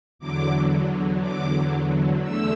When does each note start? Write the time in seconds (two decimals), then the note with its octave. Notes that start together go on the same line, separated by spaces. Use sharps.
0.19 E2 D3 F#3 D6
1.22 D6
2.23 E2 D3 A3 E6